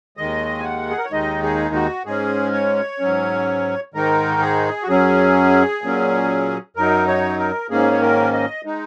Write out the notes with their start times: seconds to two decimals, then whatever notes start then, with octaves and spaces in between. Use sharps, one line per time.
0.17 D#2 D#3 G#3 D#5
0.59 G#5
0.64 F#5
0.90 G#4
0.98 A#4
1.05 C#5
1.12 D#2 D#3 G#3 D#4 D#5
1.43 G#4
1.75 F#4
2.05 G#2 G#3 C#4 G#4
2.53 C#5
3.00 G#2 F#3 C#4
3.94 G#2 D#3 G#3 D#4 A#4
4.34 A#4
4.41 G#4
4.83 F#4
4.88 F#2 F#3 C#4 G#4
5.82 A#2 F#3 C#4
6.76 F#2 F#3 D#4 A#4
7.07 C#5
7.39 A#4
7.70 G#2 D#3 A#3 C#4 G#4
7.92 C#5
8.02 A#4
8.33 D#5
8.65 G#3 D#4